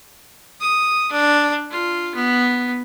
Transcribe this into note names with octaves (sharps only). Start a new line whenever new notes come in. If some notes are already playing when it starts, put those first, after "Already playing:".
D#6
D4
F4
B3